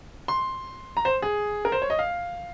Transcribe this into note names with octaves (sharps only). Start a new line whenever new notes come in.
C6
A#5
C5
G#4
A#4
C5
C#5
D#5
F5